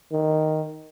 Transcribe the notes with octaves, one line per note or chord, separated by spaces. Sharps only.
D#3